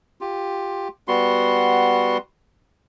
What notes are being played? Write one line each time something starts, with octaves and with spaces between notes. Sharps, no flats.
F4 G4
G3 B3 F#4 C6